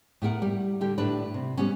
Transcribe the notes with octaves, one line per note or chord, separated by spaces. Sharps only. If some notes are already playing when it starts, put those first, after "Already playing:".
A2 B3 A#4 F#5
G3
D3 G3 G4
A2 D3 D4 B4
C3
G3 B3 C#4